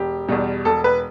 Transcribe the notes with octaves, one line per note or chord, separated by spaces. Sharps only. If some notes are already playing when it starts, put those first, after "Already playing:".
Already playing: E1 G4
E2 B2 G3
E1 A4
B4